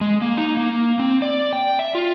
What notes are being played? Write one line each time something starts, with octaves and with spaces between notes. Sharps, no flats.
G#3
A#3
D#4
A#3
C4
D5
G5
E5
F4